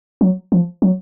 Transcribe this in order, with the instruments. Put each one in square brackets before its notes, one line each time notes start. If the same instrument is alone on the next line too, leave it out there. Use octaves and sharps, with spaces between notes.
[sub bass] F#3
F3
F#3